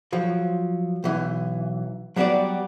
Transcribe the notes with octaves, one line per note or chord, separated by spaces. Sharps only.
F3 F#3
B1 E3
F#3 G3 B3 F#4 D5